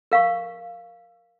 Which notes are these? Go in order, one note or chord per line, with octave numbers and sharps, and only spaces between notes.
A#4 F5 C#6